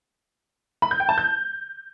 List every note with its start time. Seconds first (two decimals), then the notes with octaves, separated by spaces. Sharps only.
0.82 B5
0.91 G6
1.00 G5
1.09 A5
1.18 G6